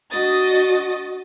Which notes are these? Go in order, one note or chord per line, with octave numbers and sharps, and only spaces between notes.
D4 F#4 D#5 D#6 A6